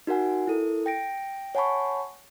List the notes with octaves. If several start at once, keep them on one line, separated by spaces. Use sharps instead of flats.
D#4 F#4 A#4 F#5 G#5
E4 A4 A#4
G5 A#6 D7
C#5 F#5 G#5 A5 B5 C#6